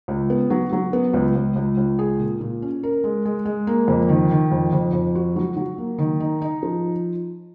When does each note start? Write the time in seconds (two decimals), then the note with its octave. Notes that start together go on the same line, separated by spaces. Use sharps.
0.08 C#2
0.30 B3
0.50 F#3
0.73 F#3
0.93 B3
1.14 C#2
1.35 C#2
1.56 C#2
1.77 C#2
1.99 G#4
2.20 A#2
2.41 A#2
2.62 C#4
2.83 A#4
3.04 G#3
3.25 G#3
3.45 G#3
3.67 A#3
3.88 F2
4.09 D#3
4.31 D#3
4.52 F2
4.73 F2
4.93 F2
5.15 F#4
5.36 F#3
5.57 F#3
5.78 A#3
5.98 D#3
6.20 D#4
6.42 D#4
6.63 F3